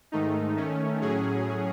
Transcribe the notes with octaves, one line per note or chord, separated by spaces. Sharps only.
G#2 D#3 A3 D#4
D#3 A3 C#4
A2 F#3 C#4 G#4